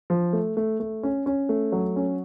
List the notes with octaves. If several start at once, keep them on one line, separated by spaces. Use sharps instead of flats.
F3
A3
A3
A3
C#4
C#4
A3
F#3
C#4